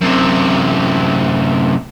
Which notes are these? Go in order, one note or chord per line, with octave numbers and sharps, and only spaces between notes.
F#2 C3